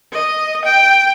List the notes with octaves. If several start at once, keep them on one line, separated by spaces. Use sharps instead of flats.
D#5
G5